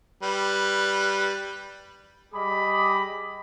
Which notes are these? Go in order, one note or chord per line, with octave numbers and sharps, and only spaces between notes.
G3 B4
G3 G#4 D#5 B5 D6